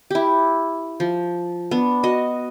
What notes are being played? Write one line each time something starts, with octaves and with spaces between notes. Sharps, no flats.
E4 G4
F3
B3 D4
F#4 D#5